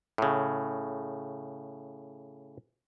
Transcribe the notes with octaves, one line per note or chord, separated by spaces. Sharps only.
A2 C#3